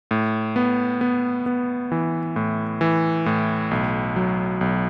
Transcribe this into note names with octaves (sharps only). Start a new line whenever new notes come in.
A2
B3
B3
B3
E3
A2
E3
A2
B1
F#3
B1